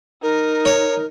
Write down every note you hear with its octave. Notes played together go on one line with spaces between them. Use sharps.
D#4 A#4
C#5